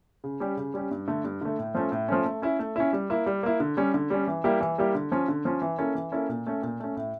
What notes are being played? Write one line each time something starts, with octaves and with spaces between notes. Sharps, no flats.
C#3
G3 C#4 G4
C#3
G3 C#4 G4
G2
D3 A3
G2
D3 A3
A2
F3 A3 C#4
A2
F3 A3 C#4
A3
C#4 E4
A3
C#4 E4
G3
A#3 E4
G3
A#3 E4
D3
G3 C#4
D3
G3 C#4
E3
G3 A#3 E4 G4
E3
G3 A#3 E4 G4
D3
F3 C#4
D3
F3 C#4
E3
A#3 C#4 E4 A4
E3
A#3 C#4 E4 A4
A#2
A3 C#4
A#2
A3 C#4
A2